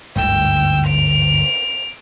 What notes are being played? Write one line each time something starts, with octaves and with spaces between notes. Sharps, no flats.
G1 D2 G#2 G5 E6
D7 F7